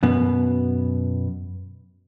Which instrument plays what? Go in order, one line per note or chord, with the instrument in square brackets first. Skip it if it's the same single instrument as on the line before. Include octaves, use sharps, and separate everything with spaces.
[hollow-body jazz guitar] F#2 B2 B3